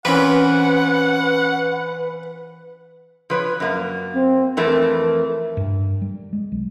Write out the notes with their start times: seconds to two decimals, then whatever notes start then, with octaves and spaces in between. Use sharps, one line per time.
0.05 A#2 E3 C4 C#4 B4 F#5 B5
3.30 F3 B4 C#5
3.60 F#2 A#3
4.14 C4
4.57 F2 E3 A3 A#4
5.57 G2
6.02 G3
6.33 G#3
6.52 B1